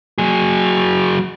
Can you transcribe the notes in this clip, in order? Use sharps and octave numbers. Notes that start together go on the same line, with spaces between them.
F#3 G#4